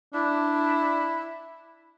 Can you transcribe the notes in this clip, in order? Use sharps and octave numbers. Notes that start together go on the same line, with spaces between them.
D4 E4